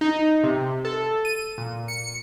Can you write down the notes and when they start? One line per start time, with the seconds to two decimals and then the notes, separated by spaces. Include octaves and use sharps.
0.01 D#4
0.44 C3
0.85 A4
1.25 D#7
1.58 A#2
1.88 C#7